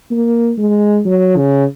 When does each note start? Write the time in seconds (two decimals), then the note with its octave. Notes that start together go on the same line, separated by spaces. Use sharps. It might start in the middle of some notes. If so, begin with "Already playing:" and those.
0.11 A#3
0.58 G#3
1.05 F#3
1.37 C#3